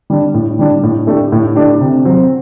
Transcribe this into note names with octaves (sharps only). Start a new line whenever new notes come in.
G3 D4
A2
G3 D4
A2
A3 D4 G4
A2
A3 D4 G4
C3
F#3 C4 F#4